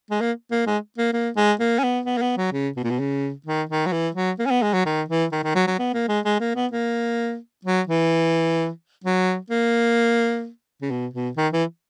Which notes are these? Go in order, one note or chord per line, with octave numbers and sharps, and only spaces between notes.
G#3
A#3
A#3
G#3
A#3
A#3
G#3
A#3
C#4
B3
B3
A#3
B3
F#3
C#3
B2
A#2
B2
C#3
D#3
D#3
F#3
E3
F#3
A#3
C#4
B3
G#3
F#3
D#3
E3
D#3
D#3
F#3
F#3
B3
A#3
G#3
G#3
A#3
B3
A#3
F#3
E3
F#3
A#3
C#3
B2
B2
D#3
E3